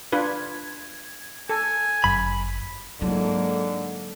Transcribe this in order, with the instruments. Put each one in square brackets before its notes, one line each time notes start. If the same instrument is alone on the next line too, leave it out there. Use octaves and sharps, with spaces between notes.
[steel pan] D4 F4 B4 [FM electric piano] G#6
[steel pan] A4 [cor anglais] G#5
[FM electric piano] G1 F#2 B6 [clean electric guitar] B5
[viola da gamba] G#2 A#3 [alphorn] D3 [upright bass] F#3 E4 [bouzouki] A4